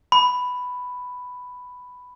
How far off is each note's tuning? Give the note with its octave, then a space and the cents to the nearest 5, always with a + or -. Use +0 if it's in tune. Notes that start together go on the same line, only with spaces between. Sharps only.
B5 +5